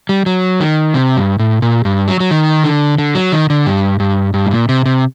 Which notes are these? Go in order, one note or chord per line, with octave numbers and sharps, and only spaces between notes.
G3
F#3
D#3
C3
G2
A2
A#2
G2
F#3
F#3
D#3
D3
D3
F#3
D#3
D3
G2
G2
G2
A2
A#2
C3
C3